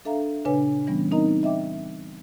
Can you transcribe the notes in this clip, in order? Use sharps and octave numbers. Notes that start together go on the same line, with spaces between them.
D4 A4 E5 F5 A#5
A#2 C#3 D4 B4 C#5 G#5
E3 G3 B3 C#4
B3 C4 D#4 A#4 D#5 A#5
D#5 E5 G5 D6